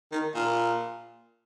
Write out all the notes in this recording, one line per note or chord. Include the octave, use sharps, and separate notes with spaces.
D#3
A#2